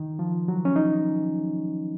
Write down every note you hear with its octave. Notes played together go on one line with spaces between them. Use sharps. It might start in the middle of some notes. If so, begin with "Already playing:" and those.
Already playing: D#3
F3
F#3
C#4
D#4